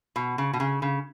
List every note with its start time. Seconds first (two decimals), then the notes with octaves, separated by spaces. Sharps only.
0.16 B2
0.38 C#3
0.53 B2
0.60 C#3
0.82 C#3